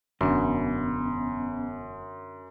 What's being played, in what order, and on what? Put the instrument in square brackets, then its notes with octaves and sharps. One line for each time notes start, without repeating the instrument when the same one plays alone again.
[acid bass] E1 [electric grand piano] F#2 [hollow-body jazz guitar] D3 [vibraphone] B3 C#4